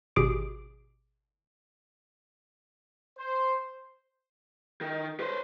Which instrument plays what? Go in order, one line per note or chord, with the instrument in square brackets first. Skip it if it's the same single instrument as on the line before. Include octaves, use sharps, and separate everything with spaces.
[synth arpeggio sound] G#1 B2 G4 G#4 D6 D7
[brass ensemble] C5
[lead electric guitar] D#3
B4 C5